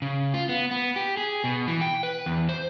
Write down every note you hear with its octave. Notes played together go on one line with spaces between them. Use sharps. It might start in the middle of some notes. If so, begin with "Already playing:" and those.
C#3
F4
B3
B3
G4
G#4
B2
E3
G5
B4
E2
C5